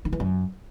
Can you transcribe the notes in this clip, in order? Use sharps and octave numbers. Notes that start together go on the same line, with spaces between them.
D#3
E3
F#2